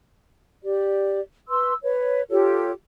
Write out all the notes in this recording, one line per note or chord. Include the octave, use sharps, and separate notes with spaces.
G4 D5
B4 C6 E6
B4 C#5
F4 G4 A4 C#5